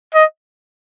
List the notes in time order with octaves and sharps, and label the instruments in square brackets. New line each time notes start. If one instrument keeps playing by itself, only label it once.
[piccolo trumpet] D#5